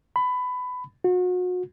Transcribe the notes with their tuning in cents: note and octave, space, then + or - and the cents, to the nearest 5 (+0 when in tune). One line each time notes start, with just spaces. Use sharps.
B5 +20
F#4 -35